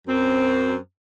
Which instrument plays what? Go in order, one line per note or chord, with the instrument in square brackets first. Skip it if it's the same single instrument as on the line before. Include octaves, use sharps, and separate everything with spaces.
[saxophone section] F#2 C4